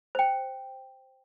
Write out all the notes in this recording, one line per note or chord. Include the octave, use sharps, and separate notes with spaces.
C5 G5